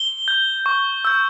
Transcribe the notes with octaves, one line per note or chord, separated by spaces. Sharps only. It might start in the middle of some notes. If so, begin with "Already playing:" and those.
Already playing: G7
G6
C#6
E6 G6